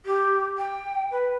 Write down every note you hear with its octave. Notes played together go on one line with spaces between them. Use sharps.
G4
G5
B4